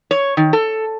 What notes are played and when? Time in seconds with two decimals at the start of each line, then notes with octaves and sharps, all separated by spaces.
0.11 C#5
0.37 D#3
0.53 A4